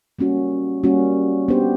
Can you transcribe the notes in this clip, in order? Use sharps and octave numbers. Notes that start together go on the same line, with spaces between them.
G3 A#3 C#4 F#4
G3 A#3 C#4 F#4
B3 D4 G4 C5